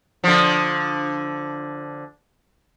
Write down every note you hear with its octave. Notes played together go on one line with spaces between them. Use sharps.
D3 F3